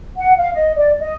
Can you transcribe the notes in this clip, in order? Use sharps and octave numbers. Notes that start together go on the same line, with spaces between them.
F#5
F5
D#5
D5
D#5